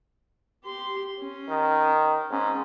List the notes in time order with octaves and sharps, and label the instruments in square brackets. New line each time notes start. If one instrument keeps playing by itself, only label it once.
[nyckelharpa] G4 C6
C#4
[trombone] D#3
[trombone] G#2 [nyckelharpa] C#4